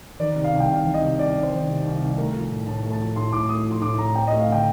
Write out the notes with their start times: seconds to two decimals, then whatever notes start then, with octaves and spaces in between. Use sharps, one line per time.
0.20 D#3 D5
0.36 C3
0.44 F5
0.52 C2
0.60 G5
0.69 C2 F5
0.86 D#3
0.94 D#5
1.02 C3
1.18 C2 D5
1.36 C2
1.43 C5
1.52 D#3
1.68 C3
1.85 C2
2.01 C2
2.17 A3 A#4
2.34 F3
2.50 A2
2.67 A2 A5
2.83 A3
2.92 A5
3.00 F3
3.16 A2 C6
3.33 A2 D6
3.49 A3 D#6
3.66 F3
3.71 C6
3.82 A2 D6
3.98 A2 A#5
4.15 C4 G5
4.27 D#5
4.32 A3
4.40 F5
4.48 D3 G5